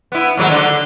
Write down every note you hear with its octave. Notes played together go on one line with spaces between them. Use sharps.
B3 E4
D#2 G#2 F#3
D3